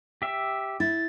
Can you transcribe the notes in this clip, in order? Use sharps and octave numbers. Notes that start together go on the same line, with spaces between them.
G4 E5
E4 A6